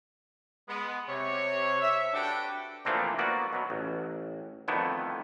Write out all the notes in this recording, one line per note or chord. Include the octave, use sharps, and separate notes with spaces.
G#3 B3
C3 C#5
E5
D4 F#4 G4 A4 B4 G5
E3 F3 A3 A#3 C4 D4
A#3 B3 F#4 D5
B2 F#3
A1
F2 D3 D#3 A3 B3 E4